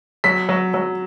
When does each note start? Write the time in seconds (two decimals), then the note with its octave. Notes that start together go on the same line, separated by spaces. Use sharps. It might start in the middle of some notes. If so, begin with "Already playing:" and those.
0.24 F#3 B6
0.49 F#3
0.74 F#3